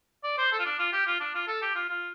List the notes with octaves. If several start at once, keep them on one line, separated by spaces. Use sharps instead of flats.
D5
C5
A4
F4
D4
F4
G4
F4
D4
F4
A4
G4
F4
F4